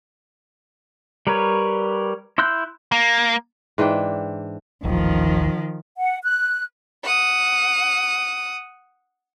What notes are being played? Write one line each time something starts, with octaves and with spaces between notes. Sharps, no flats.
G3 A#4 B4 C#5
E4 C6 E6 F#6 G6
A#3
G#2 E3 D4 G5
D#1 A1 D#2 D#3 F3
F#5
F#6
F#5 D#6